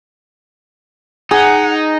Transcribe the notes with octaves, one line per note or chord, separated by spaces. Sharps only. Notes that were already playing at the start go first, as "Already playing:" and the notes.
D#4 G#4 F#5